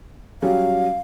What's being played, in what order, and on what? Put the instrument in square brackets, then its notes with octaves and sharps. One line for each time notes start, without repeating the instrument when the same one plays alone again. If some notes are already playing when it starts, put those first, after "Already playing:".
[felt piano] F#3 G3 C#4 [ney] F5